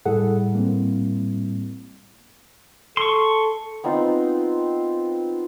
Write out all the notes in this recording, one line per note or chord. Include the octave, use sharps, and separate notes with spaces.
A2 G3 E4 G#4 A4 F#5
A#3 C4
A4 C6 C#6
B3 C4 D#4 F4